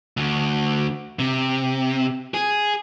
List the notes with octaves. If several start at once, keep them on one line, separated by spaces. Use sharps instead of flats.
D2
C3
G#4